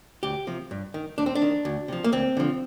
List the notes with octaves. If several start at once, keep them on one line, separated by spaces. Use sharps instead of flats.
D2 G4
C3 F3
G2
D#3
D#2 D4
C4
D4
D#3
D2
C3 F3
A#3
D2 C4
D3 F3